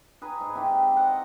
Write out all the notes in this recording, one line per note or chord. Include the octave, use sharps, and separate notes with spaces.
G#4 B4 A#5
G#2
C4 E4 G4
D#5 F#5